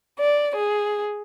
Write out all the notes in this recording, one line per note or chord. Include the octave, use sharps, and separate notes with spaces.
D5
G#4